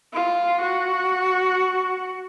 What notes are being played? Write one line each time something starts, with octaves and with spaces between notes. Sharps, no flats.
F4
F#4